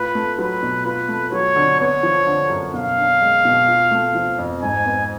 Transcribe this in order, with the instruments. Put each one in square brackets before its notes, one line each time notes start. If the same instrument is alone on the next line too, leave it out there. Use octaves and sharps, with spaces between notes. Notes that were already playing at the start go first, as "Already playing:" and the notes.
Already playing: [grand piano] A2 F4 [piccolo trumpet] B4
[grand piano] A3
[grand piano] F#3 [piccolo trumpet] B4
[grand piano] B2
[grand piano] F4 [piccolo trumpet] B4
[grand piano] A3
[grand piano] F#3 [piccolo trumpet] C#5
[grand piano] D3
[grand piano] B3 [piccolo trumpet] C#5
[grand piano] F3
D3
F#2
[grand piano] B2 [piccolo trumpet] F5
[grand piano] D4
G#3
B2
F4
A3
F3
F2
[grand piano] G#2 [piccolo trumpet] G#5
[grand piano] B3